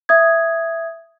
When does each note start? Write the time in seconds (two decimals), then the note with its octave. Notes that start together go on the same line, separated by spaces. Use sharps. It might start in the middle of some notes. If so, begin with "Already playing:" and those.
0.09 E5 D#6 G#6